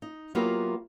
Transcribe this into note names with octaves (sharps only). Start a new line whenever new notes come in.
D#4
F#3 A#3 B3 E4 F4 G4